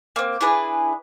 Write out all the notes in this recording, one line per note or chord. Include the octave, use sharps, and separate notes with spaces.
A#3 C4
D4 E4 G#4 B4